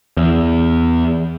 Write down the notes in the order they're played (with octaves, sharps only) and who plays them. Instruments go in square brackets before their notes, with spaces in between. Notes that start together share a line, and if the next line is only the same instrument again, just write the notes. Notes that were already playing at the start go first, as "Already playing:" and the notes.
[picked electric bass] E2